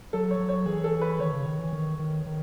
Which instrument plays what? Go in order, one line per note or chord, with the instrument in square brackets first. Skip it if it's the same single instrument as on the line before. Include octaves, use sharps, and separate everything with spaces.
[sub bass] F#3 [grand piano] A4
[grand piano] C#5
[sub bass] F#3
[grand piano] C#5
[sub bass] E3 [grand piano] G#4
[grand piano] A4
B4
[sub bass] D#3 [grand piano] C#5
[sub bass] C#3
D#3
E3
D#3
D#3
D#3